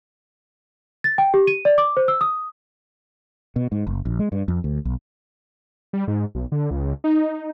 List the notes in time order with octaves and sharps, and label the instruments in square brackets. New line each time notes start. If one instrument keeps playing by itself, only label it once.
[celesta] A6
G5
G4
D#7
D5
D6
C5
E6
D#6
[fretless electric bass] B2
G#2
F#1
A#1
G#3
G2
F2
D2
B1
[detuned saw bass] G3
G#2
B1
D3
C#2
D#4